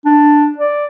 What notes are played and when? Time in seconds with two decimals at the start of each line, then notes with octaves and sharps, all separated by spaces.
0.05 D4
0.58 D5